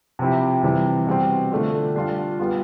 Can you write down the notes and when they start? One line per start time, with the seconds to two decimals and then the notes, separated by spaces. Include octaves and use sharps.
0.19 C3 F3 C4 E4 G4
0.63 C3 E3 G3 C4
1.07 B2 G3 C4
1.52 D3 A3 D4 F4
1.95 G3 D4 F4
2.39 G3 B3 F4